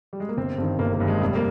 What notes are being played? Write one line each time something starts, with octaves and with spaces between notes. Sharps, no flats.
G3
G#3
A#3
G1 C4
G2 D#3 C4
G1 A#3
A#3
G2 D#3
G#3
F1 G3
A#3